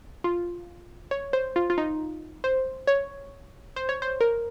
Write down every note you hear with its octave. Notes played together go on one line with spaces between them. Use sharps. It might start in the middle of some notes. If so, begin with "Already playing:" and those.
F4
C#5
C5
F4
F4
D#4
C5
C#5
C5
C#5
C5
A#4